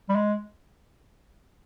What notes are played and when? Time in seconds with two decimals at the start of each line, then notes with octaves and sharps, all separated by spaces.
0.09 G3
0.15 G#3